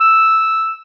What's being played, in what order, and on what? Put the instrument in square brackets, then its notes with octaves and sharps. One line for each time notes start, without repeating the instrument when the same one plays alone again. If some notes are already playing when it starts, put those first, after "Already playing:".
[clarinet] E6